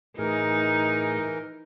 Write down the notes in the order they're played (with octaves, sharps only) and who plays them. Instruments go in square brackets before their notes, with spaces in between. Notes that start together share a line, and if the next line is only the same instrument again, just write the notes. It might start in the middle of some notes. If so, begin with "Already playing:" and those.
[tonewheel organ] A2 G#4 [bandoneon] E3 A#4 [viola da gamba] D#4